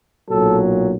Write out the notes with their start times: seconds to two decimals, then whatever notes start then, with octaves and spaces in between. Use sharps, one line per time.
0.30 B1 A#2 F#3 A4